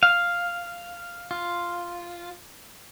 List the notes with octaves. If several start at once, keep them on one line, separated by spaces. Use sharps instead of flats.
F5
F4